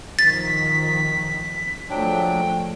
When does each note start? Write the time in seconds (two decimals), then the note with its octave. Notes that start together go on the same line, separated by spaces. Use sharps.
0.19 D#3 F3 A6 B6
1.90 F3 F#3 G#3 A3 D4 G5